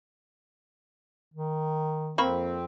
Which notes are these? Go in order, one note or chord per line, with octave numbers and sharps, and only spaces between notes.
D#3
F2 A#3 C4 B5 C#6